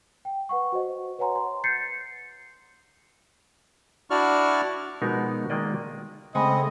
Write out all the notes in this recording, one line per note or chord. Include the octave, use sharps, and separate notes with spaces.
G5
B4 F#5 C#6
F#4 C5 D#5
B4 C#5 F#5 G#5 A#5 C6
C6
G6 A6 C7 C#7
D4 E4 F#4 D5 C#6 F6
B2 F3 G#3 B3 D#4 A#4
D#3 G#3 A#3 D5 D#5
C#3 G#3 A3 C4 D#5 F#5 G#5 B5